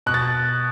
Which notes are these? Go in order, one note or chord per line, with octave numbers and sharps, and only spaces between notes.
B2 F#6
A6